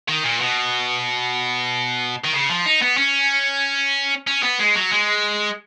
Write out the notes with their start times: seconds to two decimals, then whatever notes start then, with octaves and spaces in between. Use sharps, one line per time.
0.08 D#3
0.24 A#2
0.40 B2
2.24 D#3
2.33 C#3
2.49 F3
2.66 D#4
2.82 B3
2.97 C#4
4.27 C#4
4.43 B3
4.59 G#3
4.75 F#3
4.91 G#3